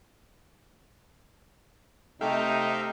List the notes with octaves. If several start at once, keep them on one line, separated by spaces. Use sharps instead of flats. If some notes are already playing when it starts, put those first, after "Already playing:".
C3 A3 D#4 E5 F5 G5